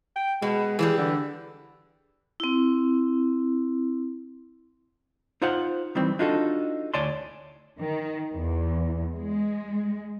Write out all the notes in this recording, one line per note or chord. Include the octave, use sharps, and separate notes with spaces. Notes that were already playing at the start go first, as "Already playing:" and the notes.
G5
B2 G#3
E3 F#3 G3 G#4
D3
C4 E4
D#4 F4 C5 F5 F#5
D#3 E3 G3 C4
D4 D#4 F4 F#4 A4
D2 C#5 D5 G#5 A5 C6
D#3
E2
G#3